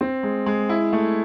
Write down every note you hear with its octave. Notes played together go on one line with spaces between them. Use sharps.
C4
G#3
G#3
E4
A3